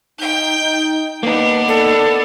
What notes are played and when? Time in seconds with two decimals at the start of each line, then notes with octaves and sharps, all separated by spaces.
0.19 D#4 G5 G6
0.60 D#4
1.23 A#3 B3 D4 D#4 B4
1.68 A4 D5